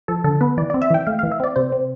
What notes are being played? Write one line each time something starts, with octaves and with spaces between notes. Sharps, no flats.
F3 A4
D3 A4
B3 B4
E3 D5
D5
C4
E5
E3 G5
A3 F5
F5
E3
E5
C4 D5
C3 C5
C4